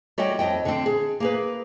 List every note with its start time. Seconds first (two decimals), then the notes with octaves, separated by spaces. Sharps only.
0.18 G3 F#4 C#5 D#5 G5
0.39 F2 D#5 G5
0.65 D3 C4
0.86 G#4
1.20 A#3 G#4 B4